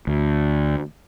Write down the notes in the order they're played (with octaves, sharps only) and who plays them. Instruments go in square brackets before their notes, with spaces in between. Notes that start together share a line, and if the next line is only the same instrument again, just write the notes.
[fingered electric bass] D2